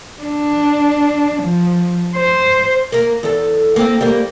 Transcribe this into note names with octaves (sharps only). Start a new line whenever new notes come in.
D4
F3
C5
A#3 A#4
E2 A4
A#3 C4
G3 A#3